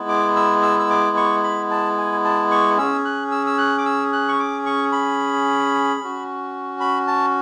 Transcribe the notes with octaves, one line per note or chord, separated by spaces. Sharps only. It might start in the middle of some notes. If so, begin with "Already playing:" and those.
Already playing: G#3 B3 E4
D6
E6
E6
E6
D6
C#6
B5
A5
G#5
A5
C#6
C#4 G#4 E6
F#6
E6
E6
F#6
D6
E6
F#6
C#6
D6
C#6
B5
C#4 F#4
B5
A5